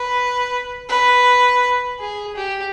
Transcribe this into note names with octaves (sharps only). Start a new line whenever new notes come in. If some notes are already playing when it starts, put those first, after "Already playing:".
Already playing: B4
B4
G#4
G4